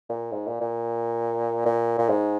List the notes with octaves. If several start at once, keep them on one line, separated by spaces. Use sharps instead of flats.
A#2
G#2
A#2
A#2
A#2
A#2
G#2